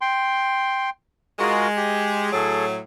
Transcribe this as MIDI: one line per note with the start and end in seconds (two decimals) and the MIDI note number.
0.01 0.90 79
0.01 0.90 84
1.39 2.31 56
1.39 1.68 65
1.39 1.68 66
1.39 1.68 70
1.77 2.30 67
2.33 2.78 45
2.33 2.78 54
2.33 2.66 68
2.33 2.66 69